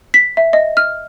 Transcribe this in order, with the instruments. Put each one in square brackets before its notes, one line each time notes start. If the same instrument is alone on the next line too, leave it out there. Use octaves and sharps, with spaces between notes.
[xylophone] B6
E5
D#5
F6